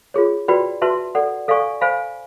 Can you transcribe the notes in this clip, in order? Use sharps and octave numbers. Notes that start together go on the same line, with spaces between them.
F4 G#4 C#5
F#4 B4 D5 G5 B5
F#4 B4 E5 A5 C6
A4 D5 F#5
A4 D5 F5 G#5 C#6
C5 F5 G#5 B5